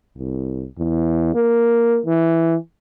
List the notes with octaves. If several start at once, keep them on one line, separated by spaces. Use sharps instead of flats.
C2
E2
A#3
E3